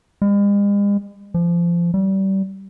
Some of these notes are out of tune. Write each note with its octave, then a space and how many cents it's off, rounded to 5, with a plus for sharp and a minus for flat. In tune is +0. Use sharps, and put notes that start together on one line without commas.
G#3 -45
F3 -25
G3 -25